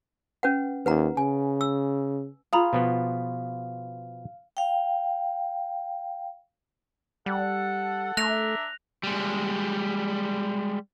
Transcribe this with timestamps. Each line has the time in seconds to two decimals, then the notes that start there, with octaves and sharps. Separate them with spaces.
0.43 C#4 B4 F#5
0.86 D#2 B4 F#5 A#5
1.17 C#3 G#5
1.61 E6
2.53 F4 G#4 F5 A#5 B5 D#6
2.73 B2 F3 B3
4.57 F5 G5
7.26 G3 A4 F#5
8.17 A3 D4 A#4 E5 F#6 A#6 F7
9.03 G3 G#3